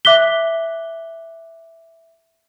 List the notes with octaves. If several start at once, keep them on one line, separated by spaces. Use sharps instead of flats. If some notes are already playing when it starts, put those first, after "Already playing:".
E5 D6 F#6 B6 G7